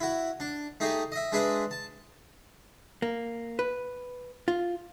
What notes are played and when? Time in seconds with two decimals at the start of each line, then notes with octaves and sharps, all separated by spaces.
0.01 E4 F#4
0.40 D4
0.80 A3 D#4 G4 G#4
1.12 D#5 E5
1.32 G#3 D4 G#4 B4 E5
1.71 A5
3.02 A#3
3.59 B4
4.48 F4